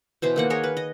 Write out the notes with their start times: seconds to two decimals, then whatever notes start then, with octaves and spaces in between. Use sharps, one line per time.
0.22 B2 E3 C5
0.36 D#3 A#3 F#5
0.50 G#4 A#4 C#5 D#5
0.63 B4
0.77 D#5